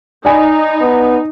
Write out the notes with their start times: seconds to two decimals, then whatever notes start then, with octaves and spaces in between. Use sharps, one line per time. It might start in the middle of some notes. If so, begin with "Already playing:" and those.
0.25 D#4 D5 G#5 B5
0.81 B3